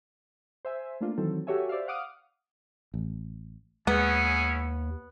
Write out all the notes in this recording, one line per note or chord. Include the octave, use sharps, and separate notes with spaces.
C5 E5 G#5
A3 A#3 D4 F4
D#3 E3 F#3 C4 A4
F#4 G4 A4 C#5 E5 G#5
C5 D5 E5 F5
F5 F#5 D6 D#6 F6
A1
D#2 G#3 B3 C#4 E4 G#4